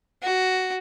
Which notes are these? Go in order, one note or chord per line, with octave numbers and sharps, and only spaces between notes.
F#4